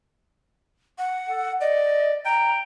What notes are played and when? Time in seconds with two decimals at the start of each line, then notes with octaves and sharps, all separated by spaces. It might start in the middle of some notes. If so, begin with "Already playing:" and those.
0.98 F#5
1.28 A4
1.61 D5 D#5
2.25 G5 A#5